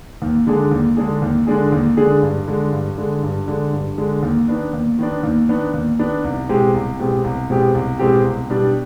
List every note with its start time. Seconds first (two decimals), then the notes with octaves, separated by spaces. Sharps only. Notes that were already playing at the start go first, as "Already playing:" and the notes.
0.22 D#2
0.47 D3 G#3 D4 G#4
0.71 D#2
0.97 D3 G#3 D4 G#4
1.22 D#2
1.47 D3 G#3 D4 G#4
1.72 D#2
1.97 D3 G#3 D4 G#4
2.22 G2
2.48 D3 G#3
2.73 G2
2.98 D3 G#3
3.23 G2
3.48 D3 G#3
3.73 G2
3.98 D3 G#3
4.23 D#2
4.48 D#3 B3 D4
4.73 D#2
4.99 D#3 B3 D4
5.23 D#2
5.49 D#3 B3 D4
5.74 D#2
5.99 D#3 B3 D4
6.24 C2
6.49 B2 G#3 C4 G4
6.74 C2
6.99 B2 G#3 C4 G4
7.24 C2
7.50 B2 G#3 C4 G4
7.74 C2
7.99 B2 G#3 C4 G4
8.25 C2
8.50 B2 G3 D4